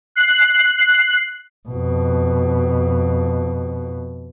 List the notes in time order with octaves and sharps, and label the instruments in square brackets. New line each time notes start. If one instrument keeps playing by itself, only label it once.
[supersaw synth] F#6 C7
[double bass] F2 B2